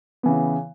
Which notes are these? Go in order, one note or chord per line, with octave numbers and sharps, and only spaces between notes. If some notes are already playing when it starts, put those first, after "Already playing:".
C#3 E3 B3